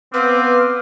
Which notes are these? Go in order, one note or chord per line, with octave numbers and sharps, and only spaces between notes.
B3 C4 B4 F5 D6 F6